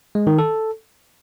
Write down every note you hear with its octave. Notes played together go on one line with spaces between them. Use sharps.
G#3
D#3
A4